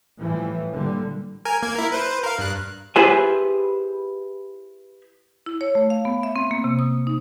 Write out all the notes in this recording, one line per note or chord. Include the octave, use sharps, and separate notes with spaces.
A2 E3 F3 G3
A#2 D3 G3
A#4 G#5
A#3 G#6
E4 A#4
B4 C5
A#4 F5
G2 F#6
E4 G4 G#4 B4 C5 G#5
E4
C#5
A3
F5
B3
E5
C4
A#3
C3
D#6
D#4